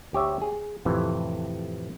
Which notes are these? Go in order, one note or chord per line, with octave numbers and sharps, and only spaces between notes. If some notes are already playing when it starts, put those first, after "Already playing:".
D2 G4 C#5 E5
G#4
F2 A2 C3 E3